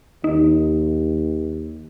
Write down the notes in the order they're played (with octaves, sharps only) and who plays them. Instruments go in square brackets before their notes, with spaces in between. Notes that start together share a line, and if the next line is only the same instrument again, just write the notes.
[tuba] D#2 [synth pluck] D#4